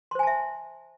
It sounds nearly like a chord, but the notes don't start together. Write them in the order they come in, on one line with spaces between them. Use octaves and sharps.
C6 C5 G#5 A5 E5